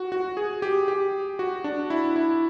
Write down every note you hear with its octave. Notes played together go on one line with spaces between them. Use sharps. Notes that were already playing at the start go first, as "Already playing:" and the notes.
Already playing: F#4
F#4
G#4
G4
G4
F#4
D4
E4
E4